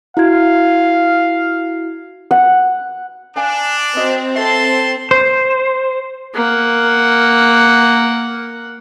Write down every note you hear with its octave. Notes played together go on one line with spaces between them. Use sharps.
E4 F#4 F5 G#6
F#5
D4 D5 F5 G#5
C4 F#4 D#5
A4 C#5 E5 A5 C6
C5
A#3 F#5